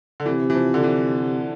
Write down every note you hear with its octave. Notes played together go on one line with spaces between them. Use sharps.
D3
C3 E3
E3
F3
D3
E3